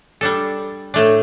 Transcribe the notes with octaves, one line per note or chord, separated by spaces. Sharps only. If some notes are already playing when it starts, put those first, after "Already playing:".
G3 D4 A4
A2 A3 D4